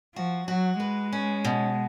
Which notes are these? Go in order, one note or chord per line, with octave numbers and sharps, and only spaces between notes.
F3 F#4
F#3 F#4
G#3 B4
C#4
B2